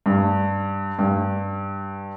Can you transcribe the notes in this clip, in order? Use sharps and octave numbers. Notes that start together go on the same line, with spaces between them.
G2
G2